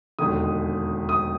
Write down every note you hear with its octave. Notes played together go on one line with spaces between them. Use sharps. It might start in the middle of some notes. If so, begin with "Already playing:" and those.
E1 D#2 D3 D#6
D#6